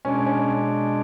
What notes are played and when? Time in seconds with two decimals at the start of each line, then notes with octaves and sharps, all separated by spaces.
0.05 B2 G#3 C#4 D4
0.26 C#4